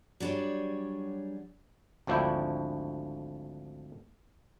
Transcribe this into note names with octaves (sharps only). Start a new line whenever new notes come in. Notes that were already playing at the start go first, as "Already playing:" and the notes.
F#3 G3 D4 G#4 C#5
G#1 D2 F3 D4 E4 G5